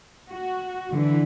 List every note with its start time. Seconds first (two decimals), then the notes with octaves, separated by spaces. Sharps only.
0.30 F#4
0.94 D3 E3